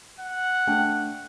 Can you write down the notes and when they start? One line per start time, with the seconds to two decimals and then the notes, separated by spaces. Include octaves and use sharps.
0.20 F#5
0.67 A3 D4 G5